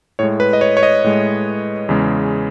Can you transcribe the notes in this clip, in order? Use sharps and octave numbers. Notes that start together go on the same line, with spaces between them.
A2 G#3 C#5
B4
D#5
C#5
C#5
D#5
A2 G#3
E2 C#3 G#3